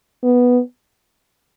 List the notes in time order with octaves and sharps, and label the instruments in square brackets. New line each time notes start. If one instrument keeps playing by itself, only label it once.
[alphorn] B3